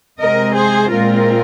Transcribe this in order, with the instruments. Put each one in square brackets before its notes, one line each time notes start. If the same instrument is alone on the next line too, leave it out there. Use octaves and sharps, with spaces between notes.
[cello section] C3 G#3 C4 A#4 D#5
G#4 C5
A#2 G#3 C4 F4 A#4